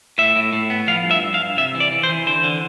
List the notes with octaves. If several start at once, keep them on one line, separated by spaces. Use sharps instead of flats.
A2 E5
A2
A2
B3
F3 F5
G2
E5
G2
F5
G2
C3 E5
E3
D5
E3
C5
E3
D3 C5
D3